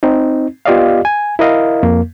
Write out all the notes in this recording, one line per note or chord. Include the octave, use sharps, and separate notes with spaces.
C4 D#4
B3 F4 G4 D5 D#5 F5
G#5
E4 A#4 D#5 F5
F2 A#3